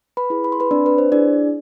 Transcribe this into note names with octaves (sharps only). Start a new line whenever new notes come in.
B4 B5
E4 G#4
B5
C6
B4 B5
C4 D4 D5
B4
C5
D4 E4 G#4 D5